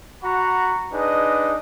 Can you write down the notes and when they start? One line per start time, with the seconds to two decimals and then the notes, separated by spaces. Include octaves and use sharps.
0.23 F#4 F#5 A#5 B5 C#6
0.92 D4 D#4 G#4 B4 D#5